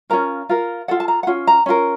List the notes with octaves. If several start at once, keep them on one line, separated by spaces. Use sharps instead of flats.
C#4 F4 A#4 A#5
F4 A#4
F4 A4 F#5
A5
A#5
F#5
C#4 F4
A#5
C#4 F4 A#4